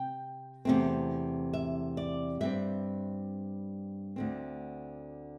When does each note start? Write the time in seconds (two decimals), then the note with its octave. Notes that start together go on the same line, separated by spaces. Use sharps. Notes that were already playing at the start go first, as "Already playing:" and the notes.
Already playing: C3 G5
0.65 E2 C3 A3 C4
1.53 E5
1.97 D5
2.41 G2 G3 C4 E5
4.16 D2 D3 C4